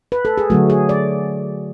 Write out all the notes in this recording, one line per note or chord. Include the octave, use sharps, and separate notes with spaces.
B4
A4
G#4
D3 F#3 A3 F#4
G#4
D5